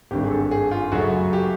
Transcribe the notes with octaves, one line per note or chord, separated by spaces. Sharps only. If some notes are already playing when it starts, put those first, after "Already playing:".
G#1 G2 D3 G4
G#4
A4
G#4
F4
F#2 C#3 F#3 A3 F#4
G4